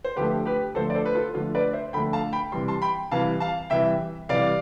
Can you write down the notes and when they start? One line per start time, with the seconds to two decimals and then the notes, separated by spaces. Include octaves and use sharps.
0.05 C5
0.16 D3 F3 A3 G4 B4
0.45 G4 B4
0.75 D3 F3 A3 A4 C5
0.90 D5
0.95 A4 C5
1.06 B4
1.15 F4 A4
1.34 D3 F3 A3 F4
1.55 B4 D5
1.73 C5 E5
1.93 D3 F3 A3 G5 B5
2.13 F5 A5
2.33 G5 B5
2.52 C3 E3 G3 C6
2.68 A5 C6
2.82 G5 B5
3.12 C3 E3 G3 F5 A5
3.40 F5 A5
3.70 C3 E3 G3 E5 G5
4.29 C3 E3 G3 D5 F5